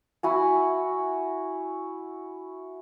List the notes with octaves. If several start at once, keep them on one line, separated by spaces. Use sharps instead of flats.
E4 F#4 G#5